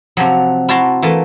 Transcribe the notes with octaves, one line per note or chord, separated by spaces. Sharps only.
C3 F3 F#3
E4 F#4 A5 A#5 C6
E3 A3 A#3 A4